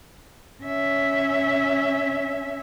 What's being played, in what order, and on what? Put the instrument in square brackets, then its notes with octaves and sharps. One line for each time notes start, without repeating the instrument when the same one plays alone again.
[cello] C#4 E5